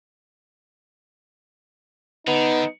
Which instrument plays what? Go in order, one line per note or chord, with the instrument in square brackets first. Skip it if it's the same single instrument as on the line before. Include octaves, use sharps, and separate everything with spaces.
[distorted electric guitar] D3 [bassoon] B3 [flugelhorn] D#4